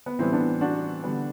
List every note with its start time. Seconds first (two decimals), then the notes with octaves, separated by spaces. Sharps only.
0.06 B3
0.19 A2 E3 G3 B3 C4
0.33 B3 D4
0.61 D4 F#4
1.03 D3 G3 B3